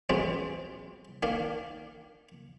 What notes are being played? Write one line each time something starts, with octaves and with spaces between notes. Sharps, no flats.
A1 B2 G#3 C4
D#3 A#3 D4